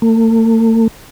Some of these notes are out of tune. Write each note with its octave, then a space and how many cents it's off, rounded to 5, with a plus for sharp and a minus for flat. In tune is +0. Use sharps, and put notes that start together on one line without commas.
A3 +45